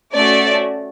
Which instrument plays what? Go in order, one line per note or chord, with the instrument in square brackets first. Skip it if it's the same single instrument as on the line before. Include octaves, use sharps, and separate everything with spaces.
[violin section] A3 C#4 F#4 A4 D5